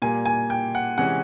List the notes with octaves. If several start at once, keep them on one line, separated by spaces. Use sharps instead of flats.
A#2 G3 A#3 G#5
G#5
G5
F#5
C3 E3 G#3 C#4 F#5